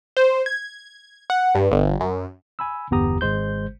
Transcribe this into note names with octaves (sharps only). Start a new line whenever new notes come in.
C5
G#6
F#5
G2
G1
F#2
G#5 B5 E6
G1 E2 B3 G4 A#5 D#6
G#1 G#3 C5 G6